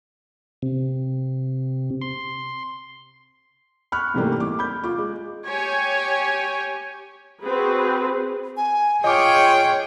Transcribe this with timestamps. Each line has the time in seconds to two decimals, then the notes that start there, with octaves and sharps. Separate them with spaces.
0.62 C3
2.02 C6
3.92 B5 C#6 F6 F#6
4.14 G#2 C3 E3 G3 A3 A#3
4.40 D6
4.59 B5 G6
4.84 F4 D6
4.98 G#3
5.46 G4 C#5 G#5
7.43 C4 F#4 G#4 B4
8.57 G#5
9.04 F4 G#4 C#5 D#5 G5 D6